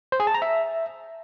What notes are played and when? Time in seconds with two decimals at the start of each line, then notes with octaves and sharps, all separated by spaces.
0.12 C5
0.20 G#4
0.27 A5
0.34 A#5
0.42 E5